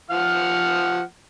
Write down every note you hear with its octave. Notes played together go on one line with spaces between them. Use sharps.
F3 F#5 F6